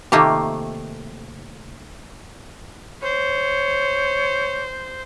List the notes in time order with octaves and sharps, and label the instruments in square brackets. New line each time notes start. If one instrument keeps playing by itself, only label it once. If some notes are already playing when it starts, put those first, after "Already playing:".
[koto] C3 D#3 A3 A#3 F4 G4
[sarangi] C5 [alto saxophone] C#5